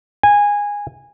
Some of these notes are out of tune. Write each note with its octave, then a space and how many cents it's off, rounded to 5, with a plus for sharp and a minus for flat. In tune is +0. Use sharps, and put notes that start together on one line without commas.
G#5 -15